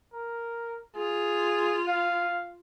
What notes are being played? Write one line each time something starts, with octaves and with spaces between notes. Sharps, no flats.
A#4
F4 G#4
F5